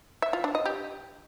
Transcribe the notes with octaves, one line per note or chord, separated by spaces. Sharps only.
E5
F4
D4
D#5
G4